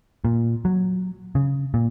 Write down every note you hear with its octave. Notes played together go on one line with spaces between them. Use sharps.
A#2
F#3
C#3
A#2